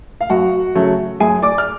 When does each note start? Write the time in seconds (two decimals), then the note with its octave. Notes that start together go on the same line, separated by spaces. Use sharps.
0.21 F5
0.30 F#2 F#4 F#5
0.75 C#3 F#3 A3
1.20 F#2 G#4 G#5
1.42 D5 D6
1.58 F6